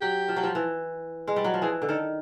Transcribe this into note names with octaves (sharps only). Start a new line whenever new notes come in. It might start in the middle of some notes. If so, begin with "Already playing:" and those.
F#3 G4
F3
F#3
F3
E3
G#3
G3
F#3
F3
E3 G#4
D3
D#3 A4